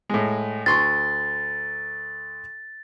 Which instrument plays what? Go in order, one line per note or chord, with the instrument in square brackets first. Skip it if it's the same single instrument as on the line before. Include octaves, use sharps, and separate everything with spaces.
[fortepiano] A2 G#3
[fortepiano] D2 C6 C#6 [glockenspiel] A6